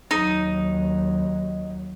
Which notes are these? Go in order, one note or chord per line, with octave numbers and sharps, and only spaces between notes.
D#2 F#3 D#4